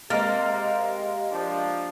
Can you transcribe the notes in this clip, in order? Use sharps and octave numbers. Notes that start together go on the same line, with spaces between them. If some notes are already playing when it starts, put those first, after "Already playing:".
C3 G#3 A#3 G4 F6 A6
F3 D4